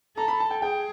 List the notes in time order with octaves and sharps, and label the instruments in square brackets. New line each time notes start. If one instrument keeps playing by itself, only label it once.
[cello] A4 [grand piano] A#5
[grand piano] B5
A5
G5
[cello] G#4 [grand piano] G5